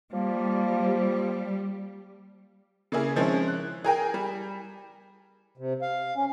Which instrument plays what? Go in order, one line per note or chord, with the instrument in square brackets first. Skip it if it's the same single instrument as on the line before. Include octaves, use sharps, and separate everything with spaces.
[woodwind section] F3 A#3 [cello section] G3
[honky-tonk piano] C#3 A#3 E4 G#4
D#3 F3 G#3 C4 C#4 E4
F#6
G#4 A#4 G5 G#5
G3
[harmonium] C3
F5
C#4